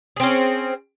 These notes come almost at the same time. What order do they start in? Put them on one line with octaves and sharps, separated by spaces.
G#4 C4 C#4